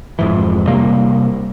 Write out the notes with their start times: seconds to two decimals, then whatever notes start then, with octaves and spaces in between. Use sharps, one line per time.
0.19 F2 G#2 E3
0.67 C3 G3 A#3